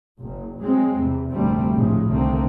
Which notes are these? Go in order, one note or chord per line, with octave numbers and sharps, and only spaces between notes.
F#1 F#2
F#3 G#3 C4
E2 C3
F1 D2 A#2 G3 A3 C4
A#1 A2 C#3 F3 G#3
C2 D3 D#3 A3 A#3 C4